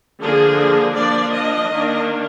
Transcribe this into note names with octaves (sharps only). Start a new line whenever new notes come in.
D3 F3 A#3 D4 G#4
F3 A#3 D4 D5
D#5
D#3 A#3 D4